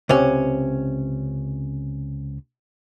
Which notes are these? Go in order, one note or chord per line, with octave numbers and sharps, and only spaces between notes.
C#2 C3 C#4